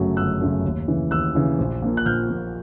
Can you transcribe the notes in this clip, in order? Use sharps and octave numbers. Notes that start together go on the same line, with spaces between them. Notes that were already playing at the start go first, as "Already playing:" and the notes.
Already playing: G1 F#2 C#3 F#3 A3
G1 E6 F#6
F#2 C#3 F#3 A3
D#2
C#3 E3
D#2 E6 F#6
C#3 E3
A#1
A#2 F3 A#3
F#6
A#1 F6 G6
A#2 F3 A#3